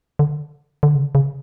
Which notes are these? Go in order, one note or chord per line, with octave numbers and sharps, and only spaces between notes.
D3
D3
C#3
C#3